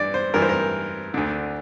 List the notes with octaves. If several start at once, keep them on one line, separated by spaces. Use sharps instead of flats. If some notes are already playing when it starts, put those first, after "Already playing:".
Already playing: G2 E3 D5
C5
G2 E3 A#4
C5
A#4
D2 D3